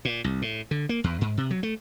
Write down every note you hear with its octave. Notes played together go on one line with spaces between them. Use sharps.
A#2
C2
A2
D3
A#3
E2
G#2
C3
F#3
A3